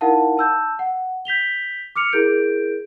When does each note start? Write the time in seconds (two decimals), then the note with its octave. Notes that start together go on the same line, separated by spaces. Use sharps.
0.01 D#4 E4 A#4 F5 F#5 A5
0.37 A5 E6 G6
0.79 F#5
1.25 G6 B6 F7 G7
1.96 D6 F6 C#7 F7
2.12 E4 G#4 A#4 G6 D7